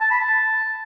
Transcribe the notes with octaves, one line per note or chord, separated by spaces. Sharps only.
A5
B5
A5